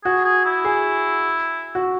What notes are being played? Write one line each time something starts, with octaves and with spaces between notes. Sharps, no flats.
F#4 G#4
G#4
E4
G#4
F#4